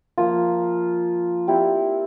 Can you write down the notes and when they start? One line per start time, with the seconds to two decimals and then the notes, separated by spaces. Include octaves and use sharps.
0.18 F3 A#3 F4
1.48 C4 E4 G4 D5